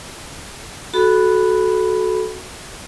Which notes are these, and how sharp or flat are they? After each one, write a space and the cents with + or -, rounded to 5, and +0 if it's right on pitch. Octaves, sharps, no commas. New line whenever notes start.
F#4 +0 A4 -20 B5 +0